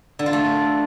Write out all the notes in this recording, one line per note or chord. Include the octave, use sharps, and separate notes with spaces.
D3
F4
A3